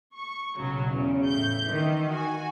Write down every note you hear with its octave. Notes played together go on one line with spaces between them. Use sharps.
C#6
B1 C#3 F#3
E2 C#3
A2 G6
D#3 E3
F#4 G#5